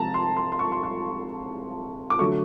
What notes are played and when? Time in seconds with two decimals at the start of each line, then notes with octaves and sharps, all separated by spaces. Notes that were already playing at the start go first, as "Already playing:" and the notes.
Already playing: C3 F3 G#3 A5 A#5
0.14 C6
0.36 C6
0.52 C6
0.59 C#6
0.72 C6
0.83 C#6
2.10 D6
2.19 D3 F#3 A3 C#6